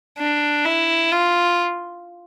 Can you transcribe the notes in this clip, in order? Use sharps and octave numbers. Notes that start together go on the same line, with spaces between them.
D4
E4
F4